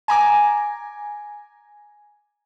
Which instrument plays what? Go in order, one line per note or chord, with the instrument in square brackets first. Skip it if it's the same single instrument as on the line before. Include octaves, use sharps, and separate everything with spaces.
[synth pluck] G#5 A#5 D6